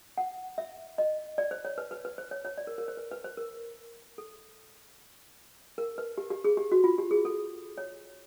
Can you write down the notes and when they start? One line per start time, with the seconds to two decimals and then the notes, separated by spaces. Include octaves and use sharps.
0.18 F#5
0.58 E5
0.98 D#5
1.38 D5
1.51 C5
1.65 C#5
1.78 B4
1.91 B4
2.05 B4
2.18 C5
2.31 C#5
2.45 C#5
2.58 D5
2.67 A#4
2.78 A#4
2.88 C5
2.97 B4
3.11 B4
3.24 C5
3.37 A#4
4.18 A4
5.78 A#4
5.98 B4
6.18 G4
6.30 G4
6.44 G#4
6.57 G4
6.72 F#4
6.84 F4
6.98 G4
7.11 G#4
7.25 A4
7.78 C#5